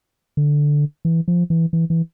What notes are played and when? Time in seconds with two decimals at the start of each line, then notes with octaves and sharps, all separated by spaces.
0.37 D3
1.05 E3
1.28 F3
1.50 E3
1.73 E3
1.90 E3